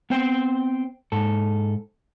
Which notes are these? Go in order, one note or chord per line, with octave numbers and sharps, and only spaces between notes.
B3 C4 C5 G5
G#2 A4